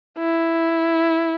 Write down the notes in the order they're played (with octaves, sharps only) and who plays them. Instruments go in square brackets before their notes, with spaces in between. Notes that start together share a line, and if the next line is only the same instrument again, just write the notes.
[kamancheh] E4